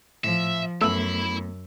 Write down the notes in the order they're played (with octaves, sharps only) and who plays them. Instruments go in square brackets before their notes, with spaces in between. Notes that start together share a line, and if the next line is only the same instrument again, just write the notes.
[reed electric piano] A2 [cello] F3 [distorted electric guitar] E5
[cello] F#2 [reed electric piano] A3 B3 [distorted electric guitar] E4 B5 [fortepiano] E6